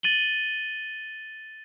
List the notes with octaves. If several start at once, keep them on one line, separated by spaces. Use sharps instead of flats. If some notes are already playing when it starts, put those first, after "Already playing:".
A6 D#7 F#7 G7